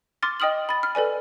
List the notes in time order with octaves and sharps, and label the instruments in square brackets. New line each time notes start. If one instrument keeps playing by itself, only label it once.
[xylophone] C6 D6 F6 A6
D#5 G5 D#6 F6 F#7
B5 A6
F6
A4 B4 D5 G#5